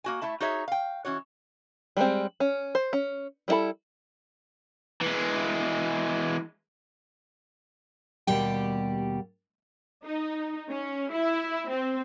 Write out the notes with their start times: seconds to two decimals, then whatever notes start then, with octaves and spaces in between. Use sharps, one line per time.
0.04 A#3 F#4 G#5
0.21 A3 E4 E5 A5
0.40 D#4 F#4 G#4 C#5 E5
0.68 F5 G5
1.05 E3 C#4 F#4 C#5
1.97 G3 G#3 C4
2.40 C#4
2.75 C5
2.93 C#4
3.48 G3 A#3 E4 A4 B5
5.01 E3 G#3
8.27 D#2 B2 G3 G4 G5
10.05 D#4
10.70 C#4
11.11 E4
11.71 C4